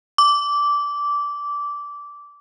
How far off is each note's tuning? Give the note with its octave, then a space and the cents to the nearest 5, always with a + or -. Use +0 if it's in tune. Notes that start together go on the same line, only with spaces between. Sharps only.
D6 -15